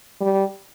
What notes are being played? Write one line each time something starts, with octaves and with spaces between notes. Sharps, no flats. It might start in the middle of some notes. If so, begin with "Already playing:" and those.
G3